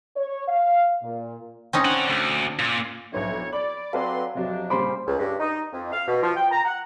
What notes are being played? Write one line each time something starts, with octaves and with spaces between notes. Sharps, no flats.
C#5
F5
A#2
C4 C#4 D#4
D4 F#5
D2
A#2
B1 A2 F3 B3 D4 C#5
D5 B5 F#7
F#3 C4 A4 B4 D5 F5 C6
F2 C3 F3 F#3 D4
A#2 C#3 G3 C5 B5 D6
C#2
G2
D#4
F2
F5
B2
F3
G5
A#5
F#5